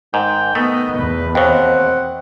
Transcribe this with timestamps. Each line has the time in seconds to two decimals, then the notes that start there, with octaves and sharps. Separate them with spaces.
0.14 G#2 D#3 G5
0.55 D#3 A3 B3 D#5
0.99 E2 B4
1.35 D#2 B2 C4 F#5